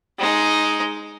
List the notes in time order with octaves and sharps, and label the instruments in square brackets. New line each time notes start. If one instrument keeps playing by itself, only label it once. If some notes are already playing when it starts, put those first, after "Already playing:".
[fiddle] G#3 D#4